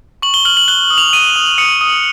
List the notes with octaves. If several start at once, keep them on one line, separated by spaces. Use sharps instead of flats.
C#6 F#7
G7
F6 F#7
F#7
F#6 G7
D#6
F7
D#6 D#7
D#6
D#6 C#7
D#6